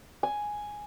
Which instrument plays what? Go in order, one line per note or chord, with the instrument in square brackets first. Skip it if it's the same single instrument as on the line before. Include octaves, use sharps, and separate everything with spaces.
[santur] G#5